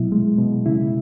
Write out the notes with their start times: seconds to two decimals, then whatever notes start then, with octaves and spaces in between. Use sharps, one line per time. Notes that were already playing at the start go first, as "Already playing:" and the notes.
Already playing: B2 F#3 E4
0.12 G#3
0.38 B2
0.66 C#3 E4